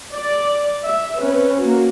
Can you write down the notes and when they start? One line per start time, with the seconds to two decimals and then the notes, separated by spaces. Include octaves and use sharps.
0.14 D5
0.86 E5
1.21 C4 C#4 B4
1.61 A#3 F#4